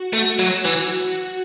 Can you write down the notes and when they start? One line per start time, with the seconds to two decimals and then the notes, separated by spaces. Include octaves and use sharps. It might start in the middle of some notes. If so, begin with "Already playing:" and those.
Already playing: F#4
0.13 A3
0.39 F#3
0.65 E3